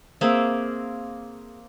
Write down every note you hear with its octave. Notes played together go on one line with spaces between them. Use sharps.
A#3 C4 G#4 E5